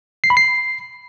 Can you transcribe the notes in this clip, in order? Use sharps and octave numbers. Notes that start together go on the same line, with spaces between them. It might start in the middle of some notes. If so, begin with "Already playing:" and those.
C7
B5
C7